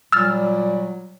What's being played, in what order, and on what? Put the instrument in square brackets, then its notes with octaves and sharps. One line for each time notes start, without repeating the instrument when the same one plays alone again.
[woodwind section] A#2 F#3 G3 [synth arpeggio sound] E6 F6 A6